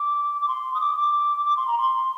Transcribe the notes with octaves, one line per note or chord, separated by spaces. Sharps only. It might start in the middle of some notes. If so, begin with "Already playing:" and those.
Already playing: D6
D6
C6
D#6
D6
D6
D6
C6
A#5
C6